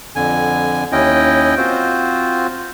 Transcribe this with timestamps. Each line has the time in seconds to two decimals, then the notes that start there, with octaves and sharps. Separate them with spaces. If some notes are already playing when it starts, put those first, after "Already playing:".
0.15 F2 D3 G#5
0.92 D#2 C#4 E4 D#5 G5
1.57 C4 F4 F#4 C5